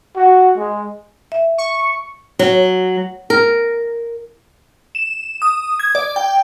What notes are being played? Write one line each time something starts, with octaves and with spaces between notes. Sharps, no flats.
F#4
G#3
E5
C#6
F#3
A#4
E7
D#6
G#6
D5
G5